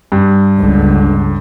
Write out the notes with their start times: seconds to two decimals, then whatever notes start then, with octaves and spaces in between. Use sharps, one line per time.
0.12 G2
0.59 G1 C#2 D3